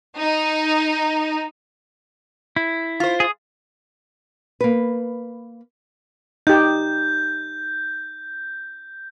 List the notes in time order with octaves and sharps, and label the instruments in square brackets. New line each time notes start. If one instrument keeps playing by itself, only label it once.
[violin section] D#4
[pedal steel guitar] E4
[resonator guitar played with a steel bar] F4 C5
[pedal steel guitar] G#4 D#6
[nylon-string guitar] A#3 B4
[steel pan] D#4 G4 [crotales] G6